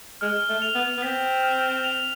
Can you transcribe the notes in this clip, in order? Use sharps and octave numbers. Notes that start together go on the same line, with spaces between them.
G#3 F6
A3
F7
B3
B3
C4 B6
F6
F7